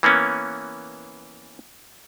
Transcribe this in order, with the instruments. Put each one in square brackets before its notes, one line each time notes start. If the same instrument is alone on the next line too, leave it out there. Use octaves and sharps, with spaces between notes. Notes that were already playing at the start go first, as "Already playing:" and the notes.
[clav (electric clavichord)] E3 A#3 B3 C#4